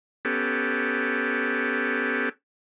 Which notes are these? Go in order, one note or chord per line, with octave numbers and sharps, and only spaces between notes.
B3 C#4 G4 A4